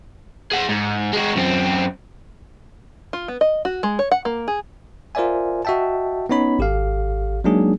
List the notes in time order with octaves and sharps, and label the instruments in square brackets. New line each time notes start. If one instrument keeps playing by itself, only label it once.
[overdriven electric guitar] G#4 F#5
G#2
G#3 F#4
F#2 C4
[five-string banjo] F4
B3
D#5
F#4
G#3
C#5
F#5
A#3
G#4
[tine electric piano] F4 A#4 C5 D5 E5 G#5
F#4 D#5 E5 G5 A5
B3 C#4 D#4 C#5 B5
G#1 G4 A4 F5
F#3 G#3 A#3 D4 D#4 G#4